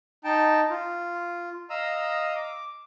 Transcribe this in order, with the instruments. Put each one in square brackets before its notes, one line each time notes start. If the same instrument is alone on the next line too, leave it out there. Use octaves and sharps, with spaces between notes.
[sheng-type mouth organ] D#4 G5 A5
F4
D#5 F5 A#5 D#6 E6
D6